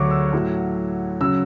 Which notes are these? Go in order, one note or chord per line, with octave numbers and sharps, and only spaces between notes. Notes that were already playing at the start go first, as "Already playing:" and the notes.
Already playing: D2 D3 F#3 C#6 D6
E6
A2 F#3
C#3 F#3 E6